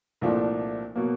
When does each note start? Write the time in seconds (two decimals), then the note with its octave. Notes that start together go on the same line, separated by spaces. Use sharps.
0.21 C2 A#2 F3 A3 D4
0.96 B2 F#3 A#3